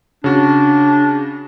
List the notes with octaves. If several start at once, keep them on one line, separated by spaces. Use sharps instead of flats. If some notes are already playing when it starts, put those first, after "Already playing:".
C#3 D4 F#4